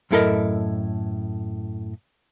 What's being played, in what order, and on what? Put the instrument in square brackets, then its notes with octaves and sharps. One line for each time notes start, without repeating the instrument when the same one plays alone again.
[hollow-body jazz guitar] F#2 A2 E4 A4 A#4 D#5